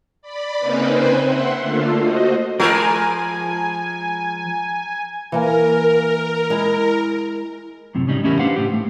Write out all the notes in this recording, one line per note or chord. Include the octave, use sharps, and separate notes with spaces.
D5 B5
C#3 A#3 C4 C#4 D#4 B4
B4 C5 G5 G#5
E5 F#5 C6
D3 A3 A#3 F4 A4 F5
F#4 C5 D#5
F3 G#3 A#4 G#5 A#5 B5
E3 A#3 A#4 G#5
G#3 E4
F#2 A2 C3
A2 C#3 G3 D#4
E2 A3 C#4 E4 G4 A#4
D4 G4 B4 C5 F5 F#5
A2 G4
A3